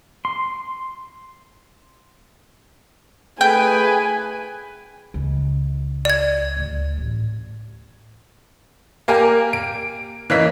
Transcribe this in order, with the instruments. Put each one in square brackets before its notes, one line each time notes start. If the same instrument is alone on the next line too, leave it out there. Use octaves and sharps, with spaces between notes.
[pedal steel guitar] C6
[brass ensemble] A3 G#4 B4 [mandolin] G5 [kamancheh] G#5
[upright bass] C#2
[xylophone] D5 G#6
[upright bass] D2
A1
[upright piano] A#3 G4 A#4 G#5
D7
E3 A#3 C#4 D#5 B6